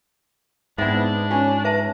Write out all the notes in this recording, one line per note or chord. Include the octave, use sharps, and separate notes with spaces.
G#2 B3 C4 D4 E4 E5
C#4 F4
B4 E5 A5